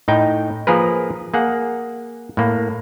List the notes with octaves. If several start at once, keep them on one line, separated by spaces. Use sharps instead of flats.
A2 D#4 G5
F3 A#3 G#4 A#4 B4
A#3 G#4 F#5
A2 A#3